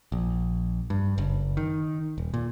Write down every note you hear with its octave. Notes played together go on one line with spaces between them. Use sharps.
A#1
G2
F#1
D#3
D#1
A#2